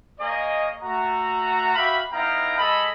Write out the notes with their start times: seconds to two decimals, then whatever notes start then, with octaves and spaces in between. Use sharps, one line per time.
0.20 A#3 G#4 C#5 D#5
0.82 A3 F#4 A#5
1.75 F#4 G4 E5 F5 B5
2.13 B3 D#4 E4 F5 G5 A#5
2.58 G#3 A4 D#5 B5